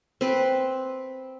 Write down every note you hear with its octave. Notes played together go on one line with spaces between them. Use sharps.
C4 B4